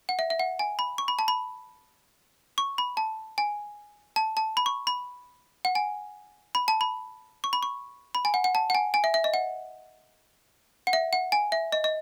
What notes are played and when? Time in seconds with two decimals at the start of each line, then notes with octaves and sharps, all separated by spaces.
0.09 F#5
0.19 E5
0.30 E5
0.39 F#5
0.59 G#5
0.79 B5
0.98 C#6
1.08 B5
1.19 A5
1.28 B5
2.58 C#6
2.78 B5
2.97 A5
3.38 G#5
4.16 A5
4.37 A5
4.57 B5
4.66 C#6
4.87 B5
5.65 F#5
5.75 G#5
6.55 B5
6.68 A5
6.81 B5
7.44 C#6
7.53 B5
7.63 C#6
8.15 B5
8.25 G#5
8.34 F#5
8.44 F#5
8.55 A5
8.70 F#5
8.75 G#5
8.94 G#5
9.04 E5
9.14 E5
9.24 D#5
9.34 F#5
10.87 F#5
10.93 E5
11.13 F#5
11.32 G#5
11.52 E5
11.72 D#5
11.84 D#5